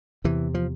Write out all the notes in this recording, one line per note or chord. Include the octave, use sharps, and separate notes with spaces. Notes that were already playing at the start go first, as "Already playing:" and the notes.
E2 C3 E3
F3